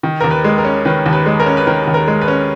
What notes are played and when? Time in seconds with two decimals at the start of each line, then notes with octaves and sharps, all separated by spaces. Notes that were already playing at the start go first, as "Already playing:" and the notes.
0.03 D#3
0.20 D#2 A#4
0.31 B4
0.44 G#3
0.58 A#4
0.65 C#4
0.85 D#3 B4
1.06 D#2
1.13 B4
1.26 G#3
1.40 A#4
1.46 C#4
1.57 B4
1.67 D#3 A#4
1.87 D#2
1.94 A#4
2.08 G#3
2.21 B4
2.28 C#4